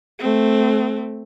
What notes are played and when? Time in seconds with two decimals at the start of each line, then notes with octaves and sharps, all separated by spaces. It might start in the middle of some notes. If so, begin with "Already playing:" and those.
0.19 A3 C4